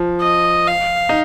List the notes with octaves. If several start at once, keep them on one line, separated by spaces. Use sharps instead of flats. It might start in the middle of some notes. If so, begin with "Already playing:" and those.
Already playing: F3
D#5
F5
D#4